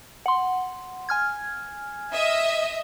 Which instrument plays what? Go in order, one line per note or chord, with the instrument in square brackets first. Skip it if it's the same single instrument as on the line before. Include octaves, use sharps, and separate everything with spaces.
[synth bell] F#5 C6
G#5 F6 G#6
[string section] D#5 E5